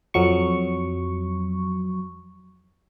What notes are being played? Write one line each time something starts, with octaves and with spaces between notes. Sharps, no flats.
F2 F#3 C#6